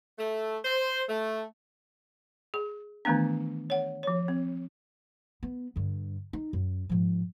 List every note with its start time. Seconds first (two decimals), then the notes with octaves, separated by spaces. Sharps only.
0.19 A3
0.65 C5
1.09 A3
2.54 G#4
3.05 D#3 E3 A3 B3 D4
3.70 C#5 F#5
4.03 F3 C#5
4.28 C4
5.43 B3
5.76 G2 D3
6.33 D#4
6.53 F#2
6.89 G#2 F3